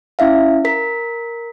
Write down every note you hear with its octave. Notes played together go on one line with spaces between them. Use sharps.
C#4 E4 E5 F5
A#4 B6